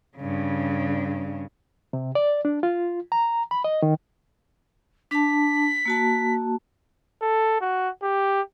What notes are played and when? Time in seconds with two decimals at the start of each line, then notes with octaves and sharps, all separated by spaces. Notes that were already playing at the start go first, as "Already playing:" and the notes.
0.17 G2 C#3
1.93 C3
2.15 D5
2.45 D4
2.63 F4
3.12 A#5
3.51 B5
3.64 D#5
3.82 D#3
5.11 D4 A5 B6
5.85 A#3 F#4 A5
7.22 A4
7.61 F#4
8.03 G4